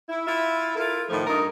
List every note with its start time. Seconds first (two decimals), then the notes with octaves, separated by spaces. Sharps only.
0.09 E4
0.26 E4 F4 E5
0.76 E4 F4 A4 A#4
1.10 A2 D#3 F3 A3
1.26 G2 D#4 A#4